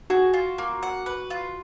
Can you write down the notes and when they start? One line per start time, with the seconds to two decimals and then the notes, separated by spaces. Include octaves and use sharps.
0.10 F#4 G#4
0.34 F4
0.58 A#3
0.83 F#5
1.06 B4
1.30 F4